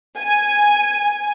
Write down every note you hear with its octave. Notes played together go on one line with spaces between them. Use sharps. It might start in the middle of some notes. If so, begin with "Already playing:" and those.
G#5